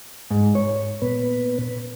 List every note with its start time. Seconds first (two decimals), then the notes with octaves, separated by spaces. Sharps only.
0.31 G#2
0.55 C#5
1.02 A#2 B3 B4